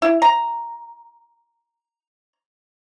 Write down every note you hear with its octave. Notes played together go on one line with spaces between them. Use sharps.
E4
A#5